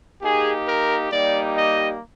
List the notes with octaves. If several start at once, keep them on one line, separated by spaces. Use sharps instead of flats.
A#3 D#4 G4 G#4
A#4
G3 A#3 D#4 G4 D5
D#5